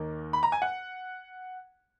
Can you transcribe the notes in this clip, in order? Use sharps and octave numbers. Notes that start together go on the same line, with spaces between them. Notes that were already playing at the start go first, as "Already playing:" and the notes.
Already playing: D#2 D#3 A#3
B5
A#5
G#5
F#5